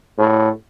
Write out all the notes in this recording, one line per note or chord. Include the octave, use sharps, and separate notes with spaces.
A2